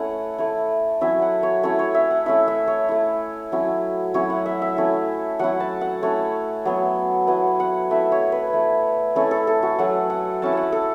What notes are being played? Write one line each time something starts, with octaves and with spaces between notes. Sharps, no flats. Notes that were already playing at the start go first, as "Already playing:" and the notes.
Already playing: A3 C#4 E4 F#5
A3 E4
F#3 C#4 E4 E5
F#5
C#5
A3 C#4 E4 C#5
C#5
E5
F#5
A3 C#4 E4 E5
E5
C#5
A3 E4
F#3 C#4 E4
F#3 C#4 E4 C#5
F#5
E5
E5
A3 C#4 E4
F#3 C#4 E4 F#5
A5
F#5
A3 C#4 E4 C#5
F#3 B3 E4
F#3 B3 E4 F#5
F#5
A3 E4 E5
C#5
B4
A3 E4
A3 C#4 E4 A4
A4
A4
F#4
F#3 A3 C#4 F#5
F#5
A3 C#4 E4 A5
F#5 A5
A4